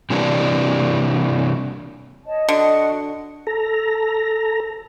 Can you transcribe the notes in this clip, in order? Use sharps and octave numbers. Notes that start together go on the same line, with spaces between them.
C3 E3 G3 A#3 D4
C#5 D#5 A5
D3 F#4 D#5
A4 A#5